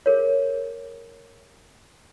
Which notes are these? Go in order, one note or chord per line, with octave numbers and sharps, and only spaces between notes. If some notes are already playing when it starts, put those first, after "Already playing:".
G#4 A#4 C#5